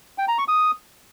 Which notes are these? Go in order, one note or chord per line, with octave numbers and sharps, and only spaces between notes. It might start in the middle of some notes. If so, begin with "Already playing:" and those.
G5
A#5
C#6
D#6